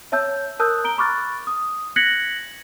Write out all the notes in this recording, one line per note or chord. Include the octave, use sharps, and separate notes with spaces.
C#5 E5 A5 E6 G6
A#4 A5 D#6 E6 F#6 G6
A#5 D7 G7
B5 C#6 D6 F6 F#6 A6
D#6
F#6 G#6 A#6 B6 C#7 F#7